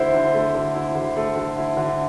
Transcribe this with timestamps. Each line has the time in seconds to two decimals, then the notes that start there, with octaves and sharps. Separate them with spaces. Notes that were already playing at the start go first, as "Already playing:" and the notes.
Already playing: D3 A3 E4 C5
0.14 D3
0.34 A3
0.54 D3
0.75 E4
0.95 D3
1.16 A3
1.36 D3
1.57 E4
1.77 D3